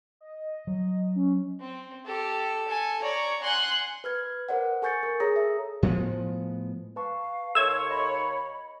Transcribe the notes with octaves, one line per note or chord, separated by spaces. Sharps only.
D#5
F#3
C#4
C4
G4 A4
G#5 A5
C#5 D5 A#5
F#5 G#5 C6 F#6
B4 F6 G#6
A#4 C5 D5 F#5
A4 G#5 C#6 G6 A6 C#7
A#4
G#4 A4 C#5 A#5 D#6 A#6
E5
A2 F3 G#3 B3
B4 F5 A5 C#6
D#2 A4 C#5 E5 C6 E6 G#6
D#5 B5